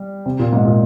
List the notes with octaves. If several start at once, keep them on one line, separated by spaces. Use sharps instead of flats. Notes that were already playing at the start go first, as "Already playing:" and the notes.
Already playing: G3
C3
A#2
G#2
A#2